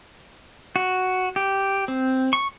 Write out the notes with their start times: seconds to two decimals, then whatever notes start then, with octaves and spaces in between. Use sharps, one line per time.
0.76 F#4
1.36 G4
1.88 C4
2.33 C#6